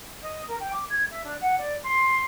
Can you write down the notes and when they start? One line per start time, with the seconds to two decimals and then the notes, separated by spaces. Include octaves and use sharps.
0.22 D#5
0.48 A#4
0.60 G5
0.72 D6
0.89 G#6
1.10 E5
1.24 D4
1.40 F#5
1.57 D5
1.83 C6